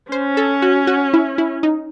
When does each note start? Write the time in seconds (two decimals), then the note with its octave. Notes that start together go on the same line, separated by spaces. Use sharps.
0.11 C#4 C5
0.37 A4
0.62 F#4
0.87 F#4
1.13 E4
1.38 E4
1.63 D#4